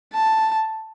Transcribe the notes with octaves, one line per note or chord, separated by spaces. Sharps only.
A5